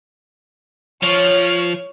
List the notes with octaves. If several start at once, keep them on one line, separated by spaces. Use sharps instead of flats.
F3 C#5 F6